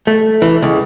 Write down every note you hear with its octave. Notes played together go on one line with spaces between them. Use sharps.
A3
E3
C#2